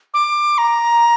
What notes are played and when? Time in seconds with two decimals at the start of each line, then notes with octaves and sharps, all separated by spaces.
0.14 D6
0.58 A#5